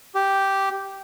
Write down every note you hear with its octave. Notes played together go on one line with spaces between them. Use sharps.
G4